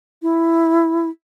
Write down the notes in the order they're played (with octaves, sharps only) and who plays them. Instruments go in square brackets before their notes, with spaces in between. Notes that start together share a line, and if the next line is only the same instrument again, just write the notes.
[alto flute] E4